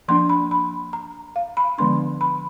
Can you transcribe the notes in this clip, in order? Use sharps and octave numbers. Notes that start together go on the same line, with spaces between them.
F3 A#3 D4 C6
B5
B5
A#5
F5
B5
D3 F3 G#3 B3 D4 C6
B5